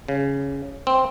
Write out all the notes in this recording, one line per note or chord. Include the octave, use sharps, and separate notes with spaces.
C#3
C4